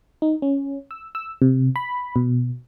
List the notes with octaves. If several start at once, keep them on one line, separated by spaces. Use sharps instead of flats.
D#4
C#4
E6
E6
C3
B5
B2